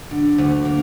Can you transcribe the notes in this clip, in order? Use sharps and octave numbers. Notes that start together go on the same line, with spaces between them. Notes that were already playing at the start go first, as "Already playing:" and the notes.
D3
D2
A#3